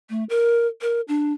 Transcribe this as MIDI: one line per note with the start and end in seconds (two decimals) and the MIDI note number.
0.10 0.24 57
0.29 0.67 70
0.82 1.01 70
1.08 1.33 62